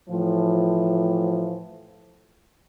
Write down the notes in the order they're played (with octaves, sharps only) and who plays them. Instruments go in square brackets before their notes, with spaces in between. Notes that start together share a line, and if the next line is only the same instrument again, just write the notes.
[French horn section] A2 E3 F3